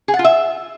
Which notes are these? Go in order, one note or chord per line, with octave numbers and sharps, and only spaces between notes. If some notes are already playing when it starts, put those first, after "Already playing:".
G#4
F#5
F4
E5